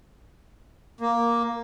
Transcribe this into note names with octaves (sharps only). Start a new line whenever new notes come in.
A#3